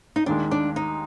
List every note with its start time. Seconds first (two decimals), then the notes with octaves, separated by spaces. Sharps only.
0.16 D#4
0.26 D#2 D#3 G#3 D4
0.51 D4
0.76 D#4